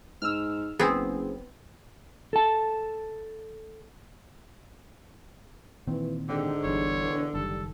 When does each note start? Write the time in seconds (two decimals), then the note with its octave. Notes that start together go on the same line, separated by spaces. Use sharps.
0.22 G#2 E6 F6
0.79 F#1 B3 C4 G#4
2.33 A4 A5
5.87 A#2 D#3 E3 C4
6.29 G#2 D3 G4
6.63 G1 E2 G2 C#5
6.99 E1
7.34 F#1 D#3 G3 A4